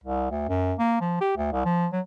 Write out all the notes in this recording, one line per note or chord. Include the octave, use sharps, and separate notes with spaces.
C2
D2
F#2
A#3
F3
G4
D2
C2
F3
F#3